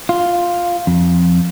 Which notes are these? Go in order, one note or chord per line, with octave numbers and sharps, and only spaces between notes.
F4
F2